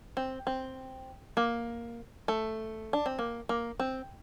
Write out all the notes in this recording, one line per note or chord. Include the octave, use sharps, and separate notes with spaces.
C4
C4
A#3
A3
D4
C4
A#3
A#3
C4